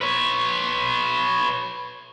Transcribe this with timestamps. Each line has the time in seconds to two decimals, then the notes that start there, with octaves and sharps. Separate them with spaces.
0.01 B4 C#5